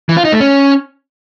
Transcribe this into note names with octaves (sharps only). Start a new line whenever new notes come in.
E3
F4
D#4
A3
C#4